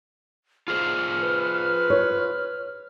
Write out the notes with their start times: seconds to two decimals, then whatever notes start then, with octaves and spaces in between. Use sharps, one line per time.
0.68 F4 G#4 C5 F6
1.23 B4
1.90 C#5